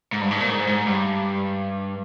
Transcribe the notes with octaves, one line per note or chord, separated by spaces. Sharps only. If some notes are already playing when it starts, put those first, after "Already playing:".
G#2
G2
G#2
A#2
G#2
G#2
G2